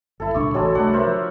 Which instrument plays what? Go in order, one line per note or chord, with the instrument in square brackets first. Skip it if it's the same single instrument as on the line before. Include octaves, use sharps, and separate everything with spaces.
[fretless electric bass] G1 [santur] E4 A4
[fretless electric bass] D#1 C#2 D4 [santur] C#6 D6
[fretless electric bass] A1 [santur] F#3 G#3 A4
[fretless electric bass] C2 A3 [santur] D4 F#5
[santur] A#4 C5 E5
[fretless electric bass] F3